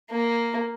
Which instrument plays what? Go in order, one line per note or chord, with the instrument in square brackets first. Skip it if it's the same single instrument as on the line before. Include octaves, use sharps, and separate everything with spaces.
[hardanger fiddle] A#3